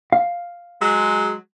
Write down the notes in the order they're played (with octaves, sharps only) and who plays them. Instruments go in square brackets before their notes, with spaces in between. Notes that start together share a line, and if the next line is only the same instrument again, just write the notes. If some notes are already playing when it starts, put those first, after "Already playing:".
[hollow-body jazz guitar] F5
[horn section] F#3 G#3